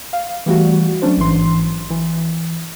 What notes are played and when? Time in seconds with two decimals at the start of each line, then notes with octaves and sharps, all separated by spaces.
0.13 F5
0.46 E3 G3 A3 F#4
1.02 F#3 A3 C#4 D4 C5
1.17 A1 G#2 E3 C6
1.90 E3